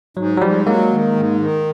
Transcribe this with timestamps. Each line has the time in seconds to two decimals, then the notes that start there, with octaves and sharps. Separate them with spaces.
0.17 G#2 F#3
0.37 F#3
0.41 G#2 F3 G3
0.66 F#3 G#3 A#3
0.91 D#3
1.16 G#2
1.40 D#3